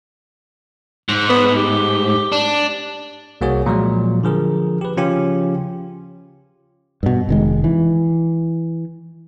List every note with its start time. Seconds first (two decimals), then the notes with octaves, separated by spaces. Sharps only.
1.09 G#2
1.29 B3
1.56 G4
2.32 D4
3.41 C2 A#3 F#4 G#4 C#5
3.66 A#2 F3 F#3 G#3
4.23 D3 F3 G#4 A#4
4.81 G4 B4
4.97 C#3 F3 C#4 F4 G4
7.03 G2 B2
7.29 F1 D#3 G#3
7.64 E3